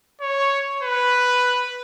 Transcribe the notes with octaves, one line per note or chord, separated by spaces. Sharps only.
C#5
B4